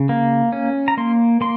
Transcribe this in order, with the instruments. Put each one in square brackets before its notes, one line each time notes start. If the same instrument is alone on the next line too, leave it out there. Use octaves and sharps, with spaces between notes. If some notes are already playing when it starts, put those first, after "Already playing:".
Already playing: [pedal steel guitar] C#3
A#3
C#4
A#5
A#3 C6
A#3 C6